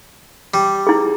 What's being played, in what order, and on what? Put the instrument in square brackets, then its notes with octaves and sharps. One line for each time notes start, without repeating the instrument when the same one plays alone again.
[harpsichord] G3
[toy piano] E4 G#4